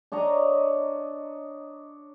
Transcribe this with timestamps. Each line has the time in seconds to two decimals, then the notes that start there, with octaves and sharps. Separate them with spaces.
0.12 D4 C#5 D#5 A#5